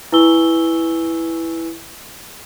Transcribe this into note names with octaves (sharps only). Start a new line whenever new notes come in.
E4 B4 G#5 C#6 E6 G7